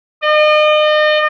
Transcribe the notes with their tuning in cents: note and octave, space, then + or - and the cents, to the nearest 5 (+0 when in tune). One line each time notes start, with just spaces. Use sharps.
D#5 -40